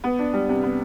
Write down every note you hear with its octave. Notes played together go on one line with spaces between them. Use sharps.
B3
D4
G3
C3
B3